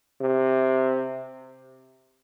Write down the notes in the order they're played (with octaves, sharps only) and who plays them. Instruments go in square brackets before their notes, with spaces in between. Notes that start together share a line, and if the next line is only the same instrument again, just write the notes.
[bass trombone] C3